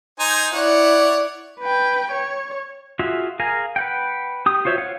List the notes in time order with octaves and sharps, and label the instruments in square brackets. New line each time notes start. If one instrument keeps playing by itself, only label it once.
[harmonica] D#4 C5 G#5
[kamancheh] E4 D5 [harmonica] C#5 F#5
[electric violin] B4 G5
C#5
[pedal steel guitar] F4 F#4 G#4 E5
G#4 A#4 F5 G#5 A#5
B4 F#5 G5
G4 D#6
F4 F#4 C5 C#5 E5
F4 C#5 F5 F#5